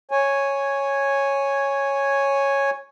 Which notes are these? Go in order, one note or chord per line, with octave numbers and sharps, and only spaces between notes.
C#5 G#5